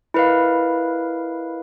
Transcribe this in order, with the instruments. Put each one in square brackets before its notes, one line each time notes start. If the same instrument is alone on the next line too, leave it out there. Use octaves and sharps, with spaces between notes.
[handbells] E4 A#4 B4 D#5 F5